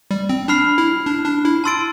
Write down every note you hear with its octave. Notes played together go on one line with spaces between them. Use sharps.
G3
C4
D4 B5 F6 C7
E4
D4
D4
E4
A5 C6 E6 A6 D7